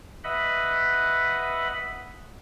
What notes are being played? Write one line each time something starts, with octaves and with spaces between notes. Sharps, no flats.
B4 D#5 E5 F#5 B5